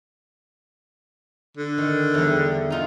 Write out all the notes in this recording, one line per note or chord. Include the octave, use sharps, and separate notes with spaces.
D3
D#3
E2 G3
D#4 F4 G#4